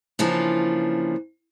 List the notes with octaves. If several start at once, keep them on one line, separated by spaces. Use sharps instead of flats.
C#3 E3 F3 A#3 D4